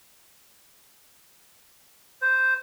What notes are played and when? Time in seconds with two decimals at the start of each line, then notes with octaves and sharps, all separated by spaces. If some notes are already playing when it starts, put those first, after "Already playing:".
2.22 C5